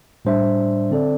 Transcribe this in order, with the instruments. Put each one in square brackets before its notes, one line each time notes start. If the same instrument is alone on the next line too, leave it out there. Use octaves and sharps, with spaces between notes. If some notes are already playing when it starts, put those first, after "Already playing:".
[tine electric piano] A2 G3 D4 C5 E5
D3 C4 A4 D5